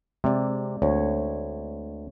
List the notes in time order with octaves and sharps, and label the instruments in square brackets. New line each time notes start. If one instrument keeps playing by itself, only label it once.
[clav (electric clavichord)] C3 [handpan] G#3 C4 D5
[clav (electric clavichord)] D2 [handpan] C#5